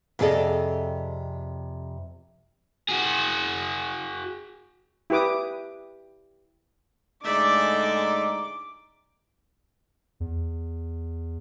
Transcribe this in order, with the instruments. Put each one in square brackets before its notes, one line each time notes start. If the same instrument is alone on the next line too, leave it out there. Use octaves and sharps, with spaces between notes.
[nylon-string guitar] F2 C3 G#4 A4 D5 D#5
[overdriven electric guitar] F#4 G#4
[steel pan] E4 G4 B4 D6 D#6
[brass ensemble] A2 D3 G#3 [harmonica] D#4 [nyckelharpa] D5 E5 [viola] D6
[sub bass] E2